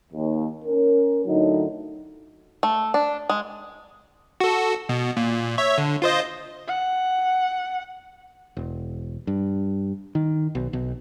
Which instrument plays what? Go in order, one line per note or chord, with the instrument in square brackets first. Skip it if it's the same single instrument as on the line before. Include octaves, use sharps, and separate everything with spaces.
[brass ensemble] D#2
C#4 A#4
A2 D3 F#3 D#4
[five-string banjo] A3
D4
G#3
[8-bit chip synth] F#4 A4
B2
A#2
C#5 E5
D3
F4 C5 D#5
[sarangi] F#5
[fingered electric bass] E1
G2
D#3
B1
B1